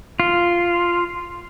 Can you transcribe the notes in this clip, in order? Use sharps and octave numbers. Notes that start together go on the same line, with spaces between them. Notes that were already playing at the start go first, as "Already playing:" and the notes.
F4